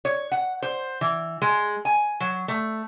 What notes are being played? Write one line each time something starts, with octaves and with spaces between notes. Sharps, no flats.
C#5
F#5
C5
E3
G#3
G#5
F#3
A3